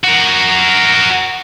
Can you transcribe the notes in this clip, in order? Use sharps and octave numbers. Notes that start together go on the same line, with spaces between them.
F#4 A#4